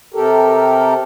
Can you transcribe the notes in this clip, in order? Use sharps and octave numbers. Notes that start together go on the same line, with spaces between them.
C3 G4 A4 A#4